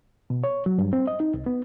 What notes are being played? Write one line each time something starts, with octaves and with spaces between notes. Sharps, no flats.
B2
C#5
F#3
G2
C4
D#5
D#4
C2
B3